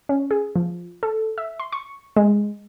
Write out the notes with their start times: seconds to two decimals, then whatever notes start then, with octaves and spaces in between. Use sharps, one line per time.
0.09 C#4
0.31 G#4
0.56 F3
1.03 A4
1.38 E5
1.59 C6
1.72 C#6
2.16 G#3